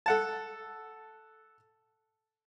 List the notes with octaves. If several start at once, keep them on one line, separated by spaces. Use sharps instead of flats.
A4 F#5 A5